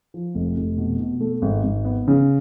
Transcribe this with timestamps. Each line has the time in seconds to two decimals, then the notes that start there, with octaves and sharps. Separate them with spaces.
0.14 F3
0.35 F1
0.57 F1
0.78 B2
1.00 B2
1.20 A3
1.42 G#1
1.63 G#1
1.85 B3
2.08 C#3